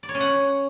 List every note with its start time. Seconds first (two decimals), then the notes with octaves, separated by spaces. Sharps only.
0.03 D5
0.09 C#5
0.15 C#4
0.20 F#5